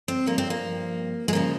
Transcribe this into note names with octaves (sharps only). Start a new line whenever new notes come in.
C4
G2 F3 A#3
C4
A#3
G#3
D#2 C#3 F3 A#3